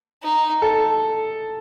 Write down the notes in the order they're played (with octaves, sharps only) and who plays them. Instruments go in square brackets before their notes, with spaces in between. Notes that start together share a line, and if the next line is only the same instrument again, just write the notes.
[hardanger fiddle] D#4
[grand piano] A4